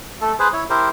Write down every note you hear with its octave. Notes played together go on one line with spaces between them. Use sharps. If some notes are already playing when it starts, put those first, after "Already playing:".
A3 A4
G#4 B4 C5
E4 C#5
E4 G4 A#4 C5